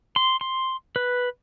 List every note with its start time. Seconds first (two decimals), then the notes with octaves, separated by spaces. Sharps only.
0.16 C6
0.41 C6
0.96 B4